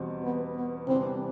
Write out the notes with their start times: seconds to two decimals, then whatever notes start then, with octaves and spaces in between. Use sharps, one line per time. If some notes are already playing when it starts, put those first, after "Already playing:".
Already playing: E2 B2 G3 C4
0.23 B3
0.56 B3
0.87 C3 E3 G3 B3 C4 D4